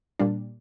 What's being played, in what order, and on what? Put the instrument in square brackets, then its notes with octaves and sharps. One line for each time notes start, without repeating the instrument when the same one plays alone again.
[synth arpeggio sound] A#2 G3 D4